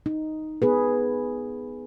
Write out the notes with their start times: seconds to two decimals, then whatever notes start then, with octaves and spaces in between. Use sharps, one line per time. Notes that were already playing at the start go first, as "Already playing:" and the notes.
0.06 D#4
0.62 B3 G#4 B4